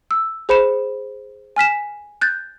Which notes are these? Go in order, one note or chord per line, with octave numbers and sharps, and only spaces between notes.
E6
G#4 C5 B5 C#7 E7
G#5 F6 B6 E7
F#6 G6 A6